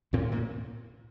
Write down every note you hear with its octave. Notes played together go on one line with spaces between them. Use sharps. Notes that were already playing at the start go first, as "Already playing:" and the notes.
A2 C3 C4
A#2 A#3